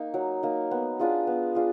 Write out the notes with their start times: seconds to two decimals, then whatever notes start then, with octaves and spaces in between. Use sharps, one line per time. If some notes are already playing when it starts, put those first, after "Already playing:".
Already playing: A#3 D#4
0.14 F#3
0.43 A#3 D#4
0.71 B3
0.99 D4 F4 G#4
1.27 B3
1.55 D4 F4 G#4